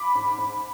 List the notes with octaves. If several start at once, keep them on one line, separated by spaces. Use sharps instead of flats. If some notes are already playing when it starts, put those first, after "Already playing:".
Already playing: B5 D6
G#2
G#2